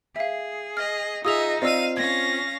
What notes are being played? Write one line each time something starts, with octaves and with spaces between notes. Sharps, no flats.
G#4 E5 F5
D#5 F6
D#4 F4 G#4 D#5 E5 D#6 E6 F7
C4 F4 D5 D#5 F5 E6 D#7
C#4 F5 G#6 A#6